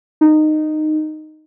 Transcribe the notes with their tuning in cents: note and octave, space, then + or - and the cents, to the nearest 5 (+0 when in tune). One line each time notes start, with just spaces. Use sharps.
D#4 -15